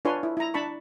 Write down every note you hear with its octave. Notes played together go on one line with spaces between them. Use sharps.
D4 F4 B4 C#5 G#5 C6
E4
E4 A#5
D4 A5 B5 C#6